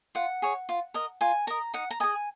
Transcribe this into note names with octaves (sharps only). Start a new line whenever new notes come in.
F4 F#5
G#4 C#5
F4
A#4 D#5
F4 G#5
A#4 D#5 A#5
D#4 F#5
A#5
G#4 D#5 G#5